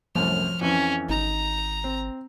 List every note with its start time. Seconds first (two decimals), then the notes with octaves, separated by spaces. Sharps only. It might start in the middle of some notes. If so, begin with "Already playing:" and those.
0.15 C2 F#2 A2 F3 F6
0.61 F2 E3 C#4
1.09 G#1 D#4 A#5
1.84 C4